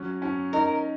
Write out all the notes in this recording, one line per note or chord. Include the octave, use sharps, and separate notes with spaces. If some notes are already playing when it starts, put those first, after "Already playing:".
Already playing: F#3 C#4
C#4
D#4 A#4